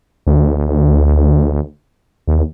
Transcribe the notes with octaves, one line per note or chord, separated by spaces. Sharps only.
D2
D#2